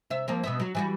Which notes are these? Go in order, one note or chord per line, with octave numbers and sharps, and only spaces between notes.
C3 E5
F3 A#3 C4
B2 B3 E5
F#3 F#4
E3 G3 F#4